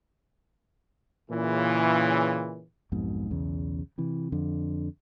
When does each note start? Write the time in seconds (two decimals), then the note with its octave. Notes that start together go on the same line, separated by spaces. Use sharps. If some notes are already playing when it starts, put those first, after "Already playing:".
1.31 A#2 C#3 E3
2.92 B1 F2 G#2 B2
3.31 B1 E2 C#3
3.98 C3 E3
4.32 F2 D3